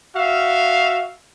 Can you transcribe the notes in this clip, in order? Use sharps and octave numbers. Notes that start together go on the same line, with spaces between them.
F#4 E5 F5